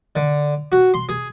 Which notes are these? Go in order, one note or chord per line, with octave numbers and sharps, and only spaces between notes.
D3
F#4
C6
G#4